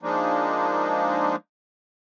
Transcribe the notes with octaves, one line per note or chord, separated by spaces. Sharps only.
F3 G#3 A#3 D4 D#4